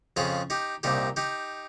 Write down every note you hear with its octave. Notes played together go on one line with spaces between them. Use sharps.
F2 C#3 F4 G#4
D#4 G4
C2 A#2 D#4 G4
D#4 G4